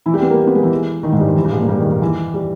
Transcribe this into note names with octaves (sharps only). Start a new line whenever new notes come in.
E3 E4
G3 G4
B3 B4
A#3 A#4
B3 B4
G#3 G#4
E3 E4
D#3 D#4
G#2 G#3
G2 G3
D#3
E3
G2 G3
G#2 G#3
A#2 A#3
G2 G3
D#3
D#3
E3
G3